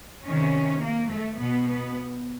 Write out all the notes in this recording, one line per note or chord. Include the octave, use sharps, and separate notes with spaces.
C3 D#3 C#4
A#3
A3
B2 B3
B3